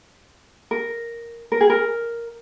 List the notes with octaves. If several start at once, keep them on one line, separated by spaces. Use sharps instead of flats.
A#4
A#4
G#4
A#4